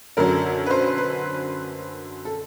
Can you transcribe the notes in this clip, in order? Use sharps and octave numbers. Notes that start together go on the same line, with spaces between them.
F#2 D3 F#3 A#4
B4
C5
B4
A4